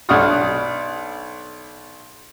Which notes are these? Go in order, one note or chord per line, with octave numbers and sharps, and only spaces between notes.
B1 D4 F#5 C#6 D#6 F6